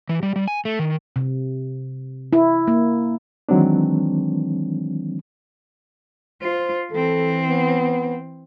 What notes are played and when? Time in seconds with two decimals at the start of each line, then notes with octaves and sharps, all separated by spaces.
0.09 E3
0.23 G3
0.36 G3
0.48 G#5
0.65 A3
0.79 D#3
1.16 C3
2.33 E4
2.68 A#3
3.49 D#3 E3 F#3 G#3 C4 D4
6.42 F4 C5
6.92 E3 C4 A4
7.48 B3